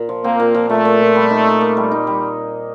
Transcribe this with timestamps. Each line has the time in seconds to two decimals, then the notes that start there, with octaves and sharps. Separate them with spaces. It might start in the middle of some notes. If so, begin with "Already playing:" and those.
Already playing: A#2
0.09 F3
0.24 A#3 C4
0.40 A#2
0.55 F3
0.70 A#2 A3
0.85 A#2
1.01 A#2
1.16 G3
1.31 D#4
1.46 D#4
1.61 A#3
1.77 G3
1.91 D#4
2.07 G3